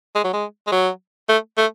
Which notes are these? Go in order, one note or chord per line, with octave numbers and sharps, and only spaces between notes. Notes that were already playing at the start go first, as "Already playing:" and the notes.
G#3
F#3
G#3
G#3
F#3
A3
A3